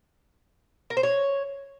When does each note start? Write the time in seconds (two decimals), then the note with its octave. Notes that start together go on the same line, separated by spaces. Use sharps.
0.90 A#4
0.97 C5
1.03 C#5